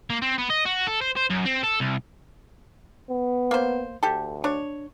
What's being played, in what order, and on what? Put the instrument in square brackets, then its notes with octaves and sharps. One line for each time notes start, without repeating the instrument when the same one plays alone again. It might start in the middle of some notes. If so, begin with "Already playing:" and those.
[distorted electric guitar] A#3
C4
B3
D#5
F#4
A4
C5
C5
F#2
C4
A4
C2
[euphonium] B3
[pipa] A#3 C5
[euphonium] D2 [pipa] G4 A4
[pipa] D4 C#5